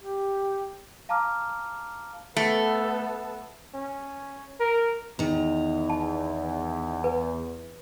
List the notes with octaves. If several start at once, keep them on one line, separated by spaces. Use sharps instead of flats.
G4
F5 A5 A#5 D6 F6
A3 B3 A4
C#4
A#4
E2 D#3 A#5
A5
B4